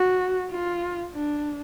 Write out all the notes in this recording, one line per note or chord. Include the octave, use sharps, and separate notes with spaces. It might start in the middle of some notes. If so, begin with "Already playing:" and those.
Already playing: F#4
F4
D4